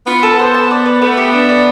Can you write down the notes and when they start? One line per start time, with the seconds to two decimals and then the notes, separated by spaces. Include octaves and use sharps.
0.07 B3 F4
0.23 A4
0.31 B3
0.39 C5
0.54 A5
0.71 D5
0.86 B4
1.02 A3 B3
1.17 G4
1.33 D4
1.49 D5